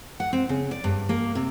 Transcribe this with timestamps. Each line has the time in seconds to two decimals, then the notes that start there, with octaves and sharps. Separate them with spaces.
0.20 F#5
0.33 C4
0.49 C#3
0.71 D5
0.84 G2
1.09 A#3
1.35 C3